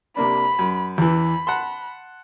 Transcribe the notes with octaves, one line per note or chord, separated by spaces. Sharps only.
C3 A#3 D4 B5
F#2
E2 E3 B5
F#5 A5 C6